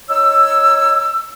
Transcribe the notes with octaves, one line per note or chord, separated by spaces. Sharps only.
D#4 C#5 E6